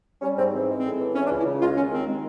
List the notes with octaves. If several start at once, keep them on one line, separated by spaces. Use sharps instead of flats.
G3 C#4
G#2 C4
E3 C4
G#3
C4
A2
E3
E3 C#4
D4
C#2
E4
C#3
G#3 F4
D#2 C#4
D#3 C4
G#3